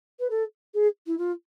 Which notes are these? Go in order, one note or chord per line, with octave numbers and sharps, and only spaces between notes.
B4
A4
G#4
E4
F4